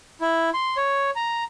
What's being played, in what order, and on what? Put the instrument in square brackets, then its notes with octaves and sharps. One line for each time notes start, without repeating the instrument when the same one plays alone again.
[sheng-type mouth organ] E4
C6
C#5
A#5